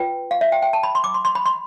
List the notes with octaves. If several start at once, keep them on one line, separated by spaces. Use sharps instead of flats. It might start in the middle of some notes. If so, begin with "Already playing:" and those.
Already playing: F4 B4 G5
F5
E5
G5
G5
A5
B5
C6
D6
C6
C6
B5
C6